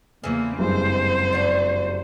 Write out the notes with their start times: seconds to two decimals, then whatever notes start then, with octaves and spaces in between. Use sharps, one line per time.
0.24 E2 C#3 E3 F3 A#3
0.59 F#1 G2 G#3 C4 C5
1.33 D4 F#4